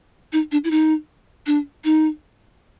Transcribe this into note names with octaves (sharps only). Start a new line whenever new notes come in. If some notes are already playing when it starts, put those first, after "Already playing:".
D#4
D4
E4
D#4
D4
D#4